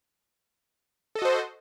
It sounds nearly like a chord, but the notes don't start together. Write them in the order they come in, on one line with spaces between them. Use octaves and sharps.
A4 D#5 F#4 C5